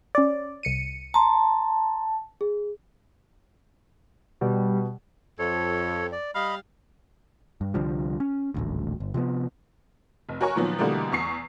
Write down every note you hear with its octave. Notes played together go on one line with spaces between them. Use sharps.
C#4 D5
C2 C#7 D#7
A5 A#5 C6
G#4
B2 G3
F2 A4 C#5
D5
G3 D#5 F5 B5
G2
C2 D3 F3 G3
C#4
D#1 A1 D2
G1
C3 F3 G3 B3
F1
F#4 A#4 C#5 G#5 C#6
A#2 D#3 F3 F#3 B3
B2 D3 E3 G3 A3 A#3
E2 C#6 C7